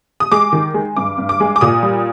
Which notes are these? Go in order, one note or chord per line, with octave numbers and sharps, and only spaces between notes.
D#6
G#3 D6
D#3
G#3
G2 D6
G2
D6
G#3
D6
A#2 D#6
G3